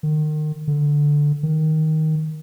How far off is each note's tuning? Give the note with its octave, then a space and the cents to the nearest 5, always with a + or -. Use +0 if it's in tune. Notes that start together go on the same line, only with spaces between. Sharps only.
D#3 -30
D3 +0
D#3 +10